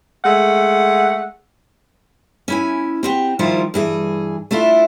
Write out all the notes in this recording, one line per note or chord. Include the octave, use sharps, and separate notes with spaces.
G#3 A3 F#5
C#4 E4 G#5
C4 F#4 G4
D#3 F3 G3 E4 F4 C5
G2 E3 G#4
A3 D4 E4 F4